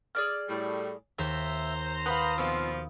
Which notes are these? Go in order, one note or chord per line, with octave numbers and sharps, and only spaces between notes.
G#4 D5 F6
A2 G3
D#2 C5 E5 A#5
B4 F5 F#5 B5 D#6
B2 F3 C4 F4